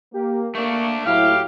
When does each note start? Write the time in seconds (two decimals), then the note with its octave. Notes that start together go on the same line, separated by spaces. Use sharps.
0.14 A#3 G4
0.55 A3 A#3 D4 C#6
1.06 A2 F#3 E4 G4 F5